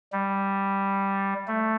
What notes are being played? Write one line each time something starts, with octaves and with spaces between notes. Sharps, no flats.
G3
A3